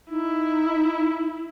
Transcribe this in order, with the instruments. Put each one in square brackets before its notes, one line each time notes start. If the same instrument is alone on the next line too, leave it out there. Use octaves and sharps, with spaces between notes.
[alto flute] D#4 [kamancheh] E4